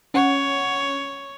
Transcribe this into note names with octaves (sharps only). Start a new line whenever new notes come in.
C#4 C#5 F#5